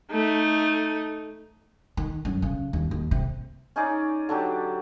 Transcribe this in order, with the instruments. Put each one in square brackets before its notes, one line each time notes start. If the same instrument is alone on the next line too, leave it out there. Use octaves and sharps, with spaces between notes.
[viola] A3 D#4
[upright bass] D#3
F#2
C#3
D#2
D#2
C3
[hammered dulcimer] C#4 D#4 G#4 D5
D3 F#3 D4 G4